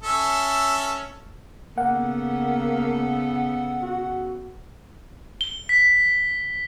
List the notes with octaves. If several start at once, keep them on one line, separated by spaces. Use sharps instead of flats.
C#4 A4 E5
C#3 A#3 B3 A4 F#5
F#4
G7
B6